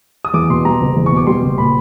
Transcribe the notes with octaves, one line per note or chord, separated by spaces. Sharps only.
D#6
E2 D6
B2 C6
G3 A#5
F#1
E2
C#6
B2 D6
G3 C6
F#1
A#2 B5